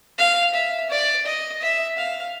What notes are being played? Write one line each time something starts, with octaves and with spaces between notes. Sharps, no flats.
F5
E5
D5
D#5
E5
F5